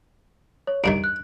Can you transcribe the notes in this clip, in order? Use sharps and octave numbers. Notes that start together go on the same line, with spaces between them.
C#5
E2 G2 D#3 D7
F#6